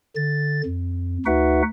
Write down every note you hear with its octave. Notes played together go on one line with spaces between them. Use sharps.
D3 A6
F2
D2 D#4 F#4 B4 E5 F#5